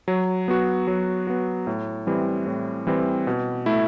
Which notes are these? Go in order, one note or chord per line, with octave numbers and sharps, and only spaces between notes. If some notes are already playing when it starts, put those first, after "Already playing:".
F#3
B3 F#4
F#3
B3 F#4
A2
E3 G3 C4
A2
E3 G3 C4
B2
A3 E4